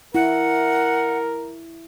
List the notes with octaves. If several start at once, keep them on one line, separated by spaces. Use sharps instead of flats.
E4 A#4 F#5